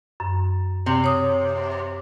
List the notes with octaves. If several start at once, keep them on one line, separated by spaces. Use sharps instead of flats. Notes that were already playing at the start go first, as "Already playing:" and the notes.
F#2
C3
C#5 D#6